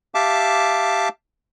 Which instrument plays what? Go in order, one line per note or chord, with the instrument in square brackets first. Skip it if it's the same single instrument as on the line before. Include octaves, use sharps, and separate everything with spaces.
[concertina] G4 E5 F5 A5 D6